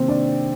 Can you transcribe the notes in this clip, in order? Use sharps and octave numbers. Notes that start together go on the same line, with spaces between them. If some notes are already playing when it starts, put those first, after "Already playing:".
Already playing: C3 D#3 A#3 C4
D4 D5